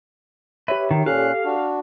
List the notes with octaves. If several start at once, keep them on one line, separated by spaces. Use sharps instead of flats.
G4 B4 C#5 E5
D#3
A#2 C#4 G4 A4 F5 F#6
D4 F#4